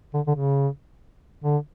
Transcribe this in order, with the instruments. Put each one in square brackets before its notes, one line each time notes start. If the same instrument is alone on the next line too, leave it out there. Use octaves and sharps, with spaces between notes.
[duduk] D3
D3
C#3
D3